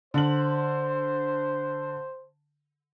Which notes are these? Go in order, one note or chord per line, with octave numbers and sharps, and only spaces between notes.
D3 C5 F#7